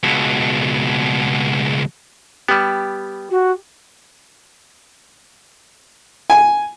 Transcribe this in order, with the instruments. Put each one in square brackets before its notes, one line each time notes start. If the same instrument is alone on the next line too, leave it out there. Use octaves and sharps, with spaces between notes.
[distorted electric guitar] C#2 B2
[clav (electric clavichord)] G3 B3 [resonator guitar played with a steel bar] G4
[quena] F#4
[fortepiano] G#5